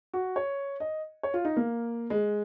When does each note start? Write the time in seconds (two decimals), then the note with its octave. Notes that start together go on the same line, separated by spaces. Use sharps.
0.13 F#4
0.36 C#5
0.80 D#5
1.23 C#5
1.34 F4
1.45 D#4
1.57 A#3
2.10 G#3